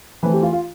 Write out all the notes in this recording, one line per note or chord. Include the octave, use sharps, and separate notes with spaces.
E3 A3 C4 B4
G4
F4
F4